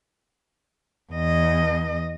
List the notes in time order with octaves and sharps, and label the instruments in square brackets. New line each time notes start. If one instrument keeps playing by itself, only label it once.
[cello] E2 D#5